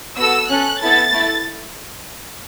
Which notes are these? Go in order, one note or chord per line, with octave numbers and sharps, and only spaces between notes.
B3 F#4 A4 E6
C#4 A4 F#6
B3 E4 A4 A6
A3 E4